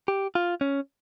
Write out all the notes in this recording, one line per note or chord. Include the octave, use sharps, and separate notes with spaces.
G4
F4
C#4